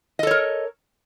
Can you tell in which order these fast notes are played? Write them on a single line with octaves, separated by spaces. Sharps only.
D#5 A4 C#5 A#4